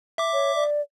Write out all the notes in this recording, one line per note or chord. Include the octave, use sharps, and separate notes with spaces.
E5 D6
C#5
D5